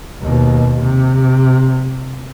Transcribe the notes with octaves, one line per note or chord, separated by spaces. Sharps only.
D#2 B2
C3